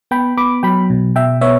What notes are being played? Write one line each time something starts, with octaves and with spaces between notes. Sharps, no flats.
B3 G5 B5
B3 B5 D6
F#3 G5 B5
B2
B2 E5 G5
B3 C#5 E5